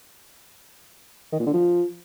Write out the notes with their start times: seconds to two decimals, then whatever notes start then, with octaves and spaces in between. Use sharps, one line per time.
1.32 D#3
1.40 A#2
1.47 D3
1.54 F3